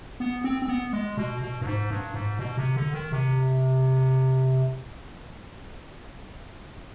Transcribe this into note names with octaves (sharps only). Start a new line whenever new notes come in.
B3
C4
C4
B3
G#3
B2
B2
G2
G#2
G2
G#2
B2
C3
D3
D#3
C3